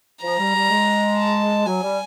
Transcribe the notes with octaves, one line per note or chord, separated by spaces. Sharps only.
F3 A#5
G3
G3
G#3
A5
F#3 G#5
G3